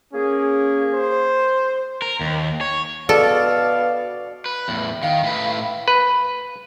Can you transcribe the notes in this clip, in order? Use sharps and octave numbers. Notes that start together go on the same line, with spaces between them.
A#3 C#4 G#4
C5
A#4
D#2
C#5
B2 A4 D5 F5
B4
E2 A2
D#3 F5
A2 B4
B4